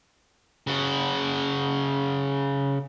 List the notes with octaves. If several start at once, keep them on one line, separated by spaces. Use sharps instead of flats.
C#3 F#4